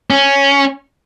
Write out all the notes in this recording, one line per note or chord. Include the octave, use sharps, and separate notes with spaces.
C#4